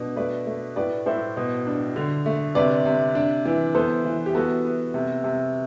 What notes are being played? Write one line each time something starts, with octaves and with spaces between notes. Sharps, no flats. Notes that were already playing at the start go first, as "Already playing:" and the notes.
Already playing: B2 D4
A3 B4 D5
A3
A2 B4 D5
A2 C5 E5
B2
D4
D3
A3
C3 B4 D5
C3
D4
E3
B3 A4 C5
E3
G4
B3 F#4 A4
B3
C3
C3